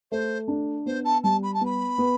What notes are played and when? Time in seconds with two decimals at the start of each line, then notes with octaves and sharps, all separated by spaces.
0.11 A3 C5
0.48 D4
0.86 B3 C5
1.04 A5
1.23 G3 A5
1.42 B5
1.54 A5
1.61 B3 B5
1.98 B3